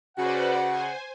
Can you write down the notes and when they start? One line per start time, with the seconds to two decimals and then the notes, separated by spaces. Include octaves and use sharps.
0.18 C#3 F#4 B4 C5 D5 F#5
0.70 C5 G#5